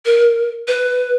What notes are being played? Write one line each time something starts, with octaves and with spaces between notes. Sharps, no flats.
A#4
B4